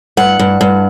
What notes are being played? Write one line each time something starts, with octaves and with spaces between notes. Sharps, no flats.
G2 F#5
G2
G2